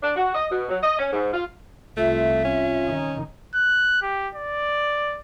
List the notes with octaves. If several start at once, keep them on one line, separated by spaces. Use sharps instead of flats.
D4
F#4
D#5
B2
F#3
D#5
C#4
G#2
F4
C2 A3 F4 E5
C#4
D#3 D#4
F#6
G4
D5